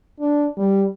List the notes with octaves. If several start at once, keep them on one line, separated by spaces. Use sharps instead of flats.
D4
G3